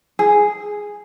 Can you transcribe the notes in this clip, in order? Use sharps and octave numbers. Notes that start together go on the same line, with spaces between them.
G#4